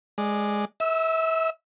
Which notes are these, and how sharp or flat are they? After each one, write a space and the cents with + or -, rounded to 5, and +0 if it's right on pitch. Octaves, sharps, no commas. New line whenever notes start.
G#3 +0 D5 +15
E5 -30 E6 +0